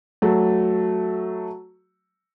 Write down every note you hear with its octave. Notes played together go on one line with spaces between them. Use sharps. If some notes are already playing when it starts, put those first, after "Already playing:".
F#3 A3